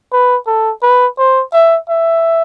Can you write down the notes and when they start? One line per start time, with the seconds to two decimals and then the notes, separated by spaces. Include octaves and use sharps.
0.12 B4
0.47 A4
0.82 B4
1.18 C5
1.53 E5
1.89 E5